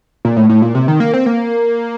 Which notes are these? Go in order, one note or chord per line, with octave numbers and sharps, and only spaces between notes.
A#2
A2
A2
A#2
C3
D#3
A#3
C4
A#3